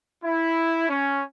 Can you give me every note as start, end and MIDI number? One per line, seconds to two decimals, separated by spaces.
0.24 0.88 64
0.89 1.22 61